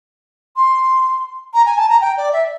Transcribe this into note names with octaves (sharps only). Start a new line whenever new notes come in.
C6
A#5
G#5
A5
A#5
G5
D5
E5